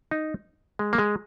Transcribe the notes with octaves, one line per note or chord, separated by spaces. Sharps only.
D#4
G#3
A#3
G#3